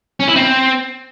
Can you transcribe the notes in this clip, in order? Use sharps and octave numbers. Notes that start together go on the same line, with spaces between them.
C#4
E4
C4